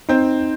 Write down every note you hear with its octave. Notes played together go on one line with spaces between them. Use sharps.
C4 D#4